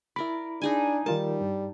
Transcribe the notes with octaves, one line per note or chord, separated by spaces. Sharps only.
E4 A#4 D5 B5
D4 D#4 G#4 G#5
D#3 G3 F4 A#4 A5
G2